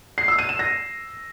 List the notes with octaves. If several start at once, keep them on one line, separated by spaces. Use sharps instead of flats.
C7
E6
D#7
E7
A#6